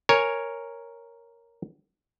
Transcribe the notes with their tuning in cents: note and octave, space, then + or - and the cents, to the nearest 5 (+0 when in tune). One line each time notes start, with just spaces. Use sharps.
A#4 +0 C#5 +0 G#5 +0